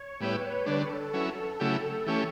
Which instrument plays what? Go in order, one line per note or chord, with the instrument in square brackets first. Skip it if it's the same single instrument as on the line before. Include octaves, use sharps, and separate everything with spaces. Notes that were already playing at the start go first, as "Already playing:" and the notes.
Already playing: [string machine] C#5
[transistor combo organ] A2 G3 B3 E4 G4 [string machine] B4
[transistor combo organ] D3 G3 D4 [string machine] A4
[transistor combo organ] F#3 C#4 E4 [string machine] A4
[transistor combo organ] C#3 F#3 A3 E4 G4 [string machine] A4
[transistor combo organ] E3 A3 C#4 G4